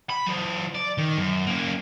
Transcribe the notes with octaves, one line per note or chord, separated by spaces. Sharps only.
B5
F#3 F4
D5
D#3
F#2
A#3 C#4